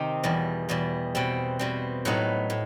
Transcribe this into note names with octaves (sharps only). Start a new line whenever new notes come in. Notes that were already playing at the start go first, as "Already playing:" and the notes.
Already playing: C3 D#3 C4 D#4
E2 B2 G3
E2 B2 G3
B2 G3 C4
B2 G3 C4
A2 F#3 B3 D#4
A2